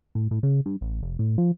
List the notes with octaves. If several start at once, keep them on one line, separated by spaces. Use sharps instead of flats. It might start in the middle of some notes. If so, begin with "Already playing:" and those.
A2
A2
C#3
G2
A1
F1
A2
F3